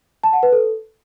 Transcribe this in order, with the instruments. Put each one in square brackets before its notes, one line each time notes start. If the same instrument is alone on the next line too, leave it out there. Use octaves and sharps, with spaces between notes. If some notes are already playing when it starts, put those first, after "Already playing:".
[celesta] A5
F#5
B4
A4